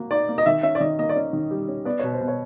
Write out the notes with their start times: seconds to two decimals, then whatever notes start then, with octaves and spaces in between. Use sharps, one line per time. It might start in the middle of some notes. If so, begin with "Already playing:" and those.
Already playing: A#3 F#4
0.11 D#4 D5
0.29 A#3
0.38 D#5
0.46 D#3 E5
0.63 C#4 E5
0.75 D5
0.80 D#3 D#5
0.99 A#3 D#5
1.09 D5
1.16 C#4 D#5
1.33 D#3
1.51 G3
1.68 C#4
1.85 B3 D5
1.99 B2 C#5
2.14 C5
2.21 B2
2.28 C#5